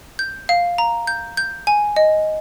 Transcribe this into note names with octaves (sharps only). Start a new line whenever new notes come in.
G6
F5
A#5
G6
G6
G#5
D#5